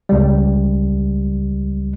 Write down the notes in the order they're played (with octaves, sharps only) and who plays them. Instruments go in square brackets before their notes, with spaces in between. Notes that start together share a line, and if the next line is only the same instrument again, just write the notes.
[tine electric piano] C#2 G3